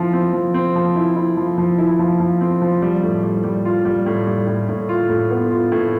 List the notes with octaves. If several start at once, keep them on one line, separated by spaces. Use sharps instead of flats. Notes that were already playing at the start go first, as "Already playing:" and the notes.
Already playing: F3 C4 E4
C4
F3
C4
F3
E4
E4
F3
F3
E4
F3
F3
C4
F3
G3
A2
G3
G3
F4
G3
A2
G3
A2
A2
F4
A2
B3
F4
A2